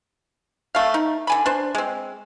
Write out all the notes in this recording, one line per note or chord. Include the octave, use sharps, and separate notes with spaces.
A3 F5
D#4
D3 G#5 B5
D4 C5
G#3 C4